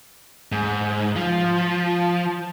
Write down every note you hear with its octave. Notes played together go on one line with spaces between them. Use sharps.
G#2
F3